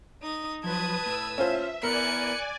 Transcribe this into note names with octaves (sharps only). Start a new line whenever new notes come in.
D#4 D#6
F3 F#3 B4 A5 D#6 G#6
A2 E6
C#4 F4 C5 E5
B3 E4 A#4 D5 G#5 F#6 C#7